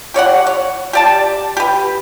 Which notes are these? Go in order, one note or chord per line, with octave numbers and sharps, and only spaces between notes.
G4 C#5 D5 F#5
C#5
G4 D5 A5
G4 B4